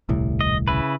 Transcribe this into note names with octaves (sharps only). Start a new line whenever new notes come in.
D#1 C2 A2
D#5
C#3 E4 B4